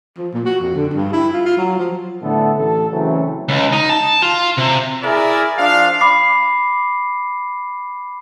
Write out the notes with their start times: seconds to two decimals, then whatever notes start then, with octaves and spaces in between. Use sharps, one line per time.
0.17 F3
0.33 A#2
0.45 F#4
0.60 F2
0.75 D3
0.93 G2
1.13 E4
1.33 F4
1.45 F4
1.57 F#3
1.78 F3
2.22 A2 D3 A3 B3 A4
2.57 A1 A4
2.92 C#3 E3 F#3 A3 C4 C#4
3.48 C#2
3.73 D#4
3.90 A5
4.22 F4
4.58 C3
5.03 E4 G#4 A#4 D5 E5
5.58 F3 D4 F5
6.01 B5 D6 C7